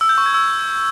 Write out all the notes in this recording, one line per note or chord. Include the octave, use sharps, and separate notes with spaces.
E6
G6
C#6
G#6
E6